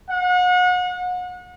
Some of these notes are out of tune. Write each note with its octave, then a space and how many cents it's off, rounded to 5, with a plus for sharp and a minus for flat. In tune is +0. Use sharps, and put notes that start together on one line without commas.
F#5 -35